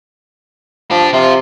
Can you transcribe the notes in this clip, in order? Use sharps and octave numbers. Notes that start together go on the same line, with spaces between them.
F3 D4 G4
C3 F3 F4